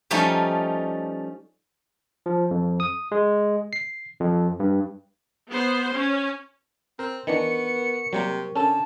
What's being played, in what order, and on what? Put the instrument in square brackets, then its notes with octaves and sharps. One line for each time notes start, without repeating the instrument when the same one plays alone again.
[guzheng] F3 G3 A3 C#4 D#4
[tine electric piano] F3
F2
D#6
G#3
C7
F2
G2
[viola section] B3 C5
C#4
[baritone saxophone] C4 [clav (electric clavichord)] A#4
[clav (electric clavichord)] D#3 E3 D4 [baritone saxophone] B3 [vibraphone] A#4 C#6 [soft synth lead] C#7
[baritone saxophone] C3 [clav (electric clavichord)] F#3 G3 A#3
[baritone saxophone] D3 [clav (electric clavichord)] C#4 A4 [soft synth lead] A5